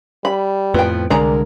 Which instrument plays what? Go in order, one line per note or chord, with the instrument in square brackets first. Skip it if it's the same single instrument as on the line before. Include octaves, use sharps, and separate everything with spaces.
[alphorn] G3 [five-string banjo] B5
[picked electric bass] F2 A2 F3 [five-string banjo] B3 G5
[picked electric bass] C2 D3 G#3 [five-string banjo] G#4 D5 A#5 [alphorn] A#4